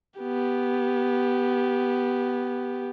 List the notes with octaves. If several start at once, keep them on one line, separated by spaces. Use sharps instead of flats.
B3 G4